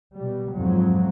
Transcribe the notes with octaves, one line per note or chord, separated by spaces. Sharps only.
B2 G3
F2 G#2 F#3